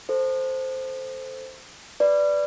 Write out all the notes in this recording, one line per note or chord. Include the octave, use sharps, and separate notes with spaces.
A4 C5
B4 D5